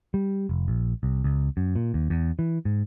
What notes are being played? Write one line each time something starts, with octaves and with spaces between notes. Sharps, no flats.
G3
F1
A#1
C2
C#2
F#2
A#2
D#2
E2
E3
G#2